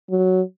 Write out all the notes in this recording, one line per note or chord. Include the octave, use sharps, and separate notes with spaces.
F#3